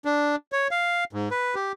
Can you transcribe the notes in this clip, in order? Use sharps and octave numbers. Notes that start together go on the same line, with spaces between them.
D4
C#5
F5
G#2
B4
G4